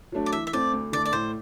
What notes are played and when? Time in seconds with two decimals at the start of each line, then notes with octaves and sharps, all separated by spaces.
0.12 F#3 A3 D4
0.26 D5
0.32 E3 E5
0.47 E5
0.53 A3 C4 D5
0.73 D2
0.92 D3 A3 D5
1.05 D5
1.12 A2 C5